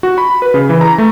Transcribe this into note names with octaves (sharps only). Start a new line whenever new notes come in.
F#4
B5
B4
C#3
E3
A#5
A3